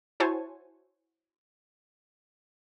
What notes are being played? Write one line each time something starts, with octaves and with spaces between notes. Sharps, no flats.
E4 F#4 C5 C#5 G#5 A5